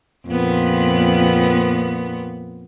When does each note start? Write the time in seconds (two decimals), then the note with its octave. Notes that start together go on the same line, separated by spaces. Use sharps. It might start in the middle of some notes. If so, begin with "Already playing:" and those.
0.26 F2 A#2 B3